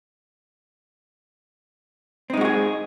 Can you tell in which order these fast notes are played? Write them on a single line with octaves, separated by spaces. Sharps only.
C4 D#4 G#3 F#4 G#4